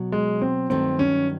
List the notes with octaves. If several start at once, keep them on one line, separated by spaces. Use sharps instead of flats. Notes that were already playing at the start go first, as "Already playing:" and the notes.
Already playing: B2 F#3
G#3
C4
G2 D#3 F#3 A3 C4
C#4